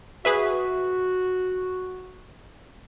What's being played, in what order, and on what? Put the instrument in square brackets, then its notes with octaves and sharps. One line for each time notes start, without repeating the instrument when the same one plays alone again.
[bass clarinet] F#4 [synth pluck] G#4 B4 E5